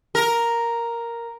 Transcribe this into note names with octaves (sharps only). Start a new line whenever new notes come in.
A#4